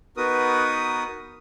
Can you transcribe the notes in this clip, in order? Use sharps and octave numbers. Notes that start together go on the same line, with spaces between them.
B3 D#4 F#4 A#4 B4 D#6